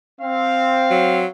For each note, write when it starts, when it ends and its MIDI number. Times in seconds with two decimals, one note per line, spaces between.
0.21 1.25 60
0.21 1.31 77
0.90 1.26 54